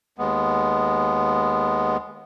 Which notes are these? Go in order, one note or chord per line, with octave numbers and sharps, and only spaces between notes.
D#2 G#3 B3